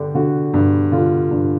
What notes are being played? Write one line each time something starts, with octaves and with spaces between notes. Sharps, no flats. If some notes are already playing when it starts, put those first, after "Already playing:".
Already playing: G2 D3 G4
D3 F#4
G2
D3 F4
G2